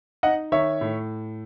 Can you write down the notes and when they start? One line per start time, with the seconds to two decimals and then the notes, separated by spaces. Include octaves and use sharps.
0.23 D#4 D#5 F#5
0.52 D#3 C#5 E5
0.81 A2